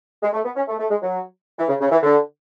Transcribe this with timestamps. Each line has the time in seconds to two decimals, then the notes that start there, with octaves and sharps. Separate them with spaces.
0.23 G#3
0.34 A3
0.45 B3
0.56 C#4
0.68 A3
0.79 A3
0.90 G#3
1.02 F#3
1.58 E3
1.69 C#3
1.81 C#3
1.91 E3
2.03 D3